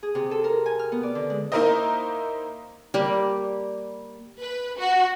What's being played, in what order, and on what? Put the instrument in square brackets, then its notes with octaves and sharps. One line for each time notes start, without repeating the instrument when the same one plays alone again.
[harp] G#4
C3
A4
A#4
G#5
F6
B3
D5
D3
G#3
[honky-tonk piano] A#3 D#4 E4 A#4 C5 D#5
[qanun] G3 A#3 G4
[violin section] B4
F#4